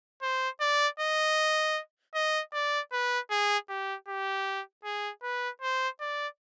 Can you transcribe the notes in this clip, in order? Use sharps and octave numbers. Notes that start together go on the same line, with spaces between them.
C5
D5
D#5
D#5
D5
B4
G#4
G4
G4
G#4
B4
C5
D5